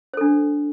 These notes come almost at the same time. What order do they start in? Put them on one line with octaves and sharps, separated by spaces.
C5 A4 D4